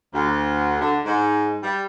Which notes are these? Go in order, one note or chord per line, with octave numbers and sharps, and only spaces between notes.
D2
D3
G#2
G3